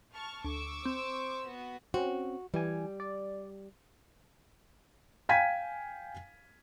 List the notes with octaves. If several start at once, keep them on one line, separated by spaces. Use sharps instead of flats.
A5 C#6 F6
D2 C#6 D6 E6
C4 C5
B3 F#4
C4 C#4 F#4
E3 G3 G#5
D5
F5 G5 G#5 G#6 B6 D#7